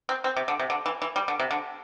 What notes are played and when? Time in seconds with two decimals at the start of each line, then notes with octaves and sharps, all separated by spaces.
0.09 C4
0.24 C4
0.36 C3
0.48 D3
0.59 C3
0.70 D3
0.86 E3
1.02 E3
1.16 G3
1.28 D3
1.40 C3
1.51 D3